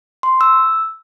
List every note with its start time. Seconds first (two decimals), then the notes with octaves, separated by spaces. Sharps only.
0.23 C6
0.41 E6